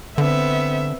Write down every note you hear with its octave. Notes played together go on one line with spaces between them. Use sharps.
D3 B3 C4 E5